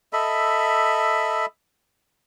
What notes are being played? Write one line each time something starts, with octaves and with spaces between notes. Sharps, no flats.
A4 D#5 E5 B5